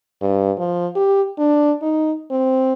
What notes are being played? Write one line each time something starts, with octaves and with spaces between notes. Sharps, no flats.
G2
F3
G4
D4
D#4
C4